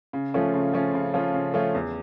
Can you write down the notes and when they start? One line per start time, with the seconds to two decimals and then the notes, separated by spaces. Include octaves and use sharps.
0.13 C#3
0.34 F3 A3 C#4 F4
0.54 C#3
0.73 F3 A3 C#4 F4
0.94 C#3
1.14 F3 A3 C#4 F4
1.34 C#3
1.54 F3 A3 C#4 F4
1.75 E2